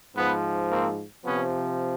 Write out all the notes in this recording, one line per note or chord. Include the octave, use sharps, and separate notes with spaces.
G#2 F3 B3
A#3 C4
C3 F3 B3 C#4